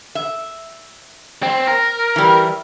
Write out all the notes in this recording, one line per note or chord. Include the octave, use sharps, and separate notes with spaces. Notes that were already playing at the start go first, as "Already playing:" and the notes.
E5
C4
A#4
E3 G3